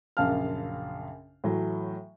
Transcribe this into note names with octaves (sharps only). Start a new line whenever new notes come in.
A#1 F#2 C#3 F5 A5 F6
A2 E3 F#3 A3